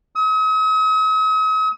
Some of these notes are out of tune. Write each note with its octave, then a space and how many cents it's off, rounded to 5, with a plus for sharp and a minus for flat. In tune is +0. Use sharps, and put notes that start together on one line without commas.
D#6 +45